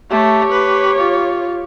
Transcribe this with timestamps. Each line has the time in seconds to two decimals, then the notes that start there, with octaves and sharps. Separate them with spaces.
0.10 A3 G4 C#5
0.52 B4
0.99 F4